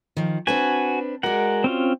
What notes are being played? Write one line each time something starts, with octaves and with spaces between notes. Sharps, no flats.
D#3 F3
C4 D4 F#4 B4 G#5
G#3 F#4 A#4 D5 F#5
C4 C#4 F4